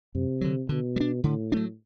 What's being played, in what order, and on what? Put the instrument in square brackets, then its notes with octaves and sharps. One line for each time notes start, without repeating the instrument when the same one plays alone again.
[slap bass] F#2 [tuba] C3
[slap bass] D3 F#3
[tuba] B2 [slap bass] D3
[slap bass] G3
D4
[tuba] A2 [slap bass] D3
[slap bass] F#3 A3 D4